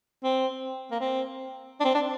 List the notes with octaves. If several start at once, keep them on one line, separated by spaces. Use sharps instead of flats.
C4
A#3
C4
D4
C4
D4